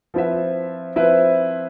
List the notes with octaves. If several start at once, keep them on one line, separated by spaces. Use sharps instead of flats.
F3 C4 E4 B4 E5
F3 C4 E4 B4 E5